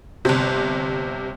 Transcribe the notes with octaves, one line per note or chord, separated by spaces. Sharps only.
G1 C3